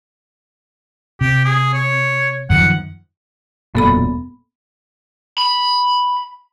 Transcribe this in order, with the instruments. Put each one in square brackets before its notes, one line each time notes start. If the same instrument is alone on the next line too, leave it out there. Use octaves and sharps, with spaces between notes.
[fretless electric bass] C3 [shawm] G4
[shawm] G#4
C#5
[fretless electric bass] F#2 D#3 F3 [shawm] F#5
[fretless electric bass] E1 F#2 A#2 [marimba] B3 A4 B5
[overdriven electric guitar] B5